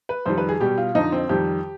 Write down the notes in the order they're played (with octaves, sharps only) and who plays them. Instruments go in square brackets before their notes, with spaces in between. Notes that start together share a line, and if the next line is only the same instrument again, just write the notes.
[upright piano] B4
F2 D#3 G3 C5
B4
G#4
B2 G3 G4
F4
F2 D3 F3 D#4
C4
F2 D#3 G3 G4